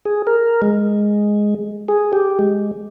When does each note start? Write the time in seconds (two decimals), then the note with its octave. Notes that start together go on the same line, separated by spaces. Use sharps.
0.05 G#4
0.27 A#4
0.62 G#3
1.88 G#4
2.13 G4
2.39 G#3